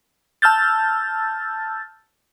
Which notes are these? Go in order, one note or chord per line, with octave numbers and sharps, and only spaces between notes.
A5 E6 F6 G6 A6